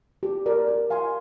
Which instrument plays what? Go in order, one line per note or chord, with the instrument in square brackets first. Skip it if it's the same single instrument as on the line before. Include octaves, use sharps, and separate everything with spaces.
[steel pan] G4
A#4 D5
A#4
F5 G#5 C6